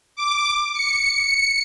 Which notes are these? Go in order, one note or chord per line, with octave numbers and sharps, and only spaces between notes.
D6
C#7